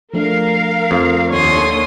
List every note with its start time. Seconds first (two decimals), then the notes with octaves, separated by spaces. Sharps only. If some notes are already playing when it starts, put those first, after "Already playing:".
0.13 F3 A3 D4 A#4 F5
0.91 F2
1.30 D#2 D3 C#5 C6 D#6